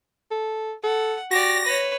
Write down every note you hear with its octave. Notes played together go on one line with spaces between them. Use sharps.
A4
A4 F#5
F#4 G4 D5 A#6
B4 C#5